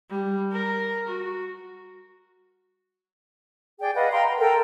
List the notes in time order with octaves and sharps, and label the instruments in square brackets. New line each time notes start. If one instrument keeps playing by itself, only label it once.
[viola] G3
A#4
F#4
[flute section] G#4 D5 G5
B4 D#5 F5 F#5
F5 G5 A#5 C6
A#5
A4 A#4 G5 A#5